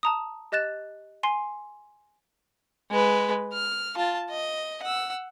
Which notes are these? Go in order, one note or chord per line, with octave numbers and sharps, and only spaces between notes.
A5 A#5 D#6
G4 D#5 F#6 A6 E7
G#5 C6 C7 G7
G#3 B4
F6
F4 A5
D#5
F#5 E6